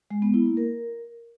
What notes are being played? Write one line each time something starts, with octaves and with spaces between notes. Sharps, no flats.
G#3
B3
E4
A#3
A#4